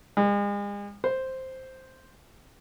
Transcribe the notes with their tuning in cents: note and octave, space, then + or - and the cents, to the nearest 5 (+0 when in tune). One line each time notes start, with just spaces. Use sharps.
G#3 -40
C5 +0